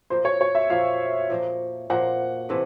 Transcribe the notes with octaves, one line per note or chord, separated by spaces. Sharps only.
A#2 F3 A#3 C5
C#5
C#5
E5
A#2 F3 A#3 F5
A#2 F3 A#3
A#2 F3 A#3 F#5
C3 E3 A3